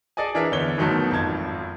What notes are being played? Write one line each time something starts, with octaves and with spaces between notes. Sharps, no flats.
G#4 A4 D5 D#5 G#5
E3 D4 G#4 A#4 E5
E2 D3 E3 C#5 G7
E2 G#2 B2 D#3 F#3 A3
G#1 F2 A5 G#6